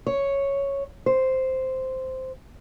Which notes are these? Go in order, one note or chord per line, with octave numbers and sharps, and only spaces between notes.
C#5
C5